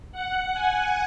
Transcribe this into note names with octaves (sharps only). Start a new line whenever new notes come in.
F#5
G#5